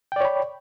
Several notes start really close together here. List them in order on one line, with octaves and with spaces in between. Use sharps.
G5 D5 C#5 B5